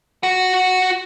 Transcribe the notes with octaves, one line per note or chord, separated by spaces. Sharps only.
F#4 F#5